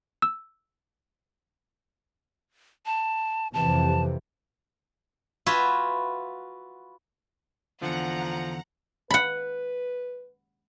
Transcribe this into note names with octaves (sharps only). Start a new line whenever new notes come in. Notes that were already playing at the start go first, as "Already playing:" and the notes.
E6
A5
F2 C3 E3 A5
F4 F#4 B4 E5 G#5
E2 D3 F3 F#5 A#5
B4 F#5 B5